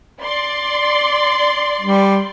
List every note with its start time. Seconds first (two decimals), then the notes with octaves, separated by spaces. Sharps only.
0.21 D5 C6
1.80 G3